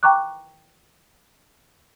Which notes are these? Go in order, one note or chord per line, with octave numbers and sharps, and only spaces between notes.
G5 A#5 C#6 D6 F#6